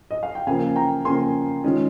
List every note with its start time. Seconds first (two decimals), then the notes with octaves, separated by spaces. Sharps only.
0.11 D#5
0.23 F5
0.35 G5
0.47 C#3 F3 A#3 F5 G#5
0.76 G5 A#5
1.05 C#3 F3 A#3 G#5 C6
1.64 D#3 G#3 C#4 F4